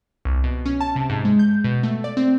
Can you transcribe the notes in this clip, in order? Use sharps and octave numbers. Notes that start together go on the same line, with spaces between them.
C2
B2
C#4
A5
C3
G#2
G#3
G6
B2
A3
D5
C4